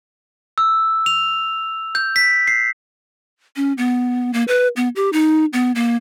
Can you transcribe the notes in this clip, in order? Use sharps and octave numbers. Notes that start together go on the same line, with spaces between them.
E6
F7
G6
B6
C7
C#4
B3
A#3
B4
B3
G4
D#4
B3
A#3